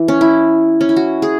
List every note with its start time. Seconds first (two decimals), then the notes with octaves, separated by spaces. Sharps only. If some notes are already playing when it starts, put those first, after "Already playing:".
Already playing: E3
0.08 C#4
0.21 E4
0.81 C#4
0.89 E4
0.96 F#4
1.22 G#4